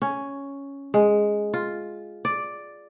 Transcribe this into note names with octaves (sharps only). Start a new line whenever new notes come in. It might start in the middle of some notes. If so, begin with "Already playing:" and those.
C#4
G#3
F4
D5